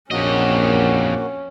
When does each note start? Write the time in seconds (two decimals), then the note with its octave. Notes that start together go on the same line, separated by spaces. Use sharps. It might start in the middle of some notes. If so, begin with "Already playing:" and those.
0.11 A#1 F2 A#3 C#4 F#4 D#5